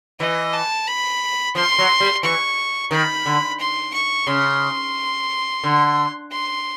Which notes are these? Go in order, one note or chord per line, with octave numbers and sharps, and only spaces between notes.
E3 D#5
A5
B5
F3 C6
F#3
G3
E3 C#6
D#3 B5
D3
C6
C#6
C#3 C6
D3
C6